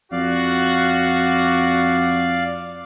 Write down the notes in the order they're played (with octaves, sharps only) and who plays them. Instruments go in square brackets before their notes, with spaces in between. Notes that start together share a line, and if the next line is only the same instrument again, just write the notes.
[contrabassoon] F2 [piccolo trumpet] F#4 [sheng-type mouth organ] D5 F5